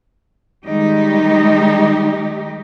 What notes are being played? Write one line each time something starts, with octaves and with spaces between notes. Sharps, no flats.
D#3 G3 G#3 D#4 G4